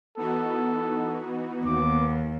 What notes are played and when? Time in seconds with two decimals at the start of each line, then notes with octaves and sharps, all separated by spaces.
0.17 E3 B3 D#4 F#4 A4
1.66 D#2 D6